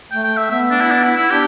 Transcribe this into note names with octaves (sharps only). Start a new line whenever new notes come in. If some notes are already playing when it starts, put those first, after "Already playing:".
A3 G5
G5
E5
B3 E5
D4
E4
D4
E4
E4
D4 G4